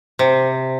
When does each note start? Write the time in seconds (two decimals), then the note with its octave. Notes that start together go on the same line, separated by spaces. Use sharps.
0.19 C3